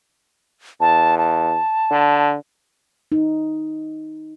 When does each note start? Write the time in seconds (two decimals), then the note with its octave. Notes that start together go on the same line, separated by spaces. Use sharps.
0.81 E2 A5
1.18 A5
1.91 D3
3.12 D#4